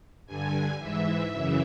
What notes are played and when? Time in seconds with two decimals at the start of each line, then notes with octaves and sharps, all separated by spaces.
0.26 G2 D3 G#5
0.79 G#2 E3 E5
1.32 F#2 C#3 E3